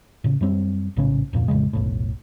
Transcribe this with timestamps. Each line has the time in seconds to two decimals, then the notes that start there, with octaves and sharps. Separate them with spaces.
0.24 A2 C#3
0.41 F#2 F#3 G3 C4
0.96 A#1 A2 C#3 C#4
1.33 D1 F2 A#2
1.48 A1 F2 C#3 G#3
1.73 F1 B1 A2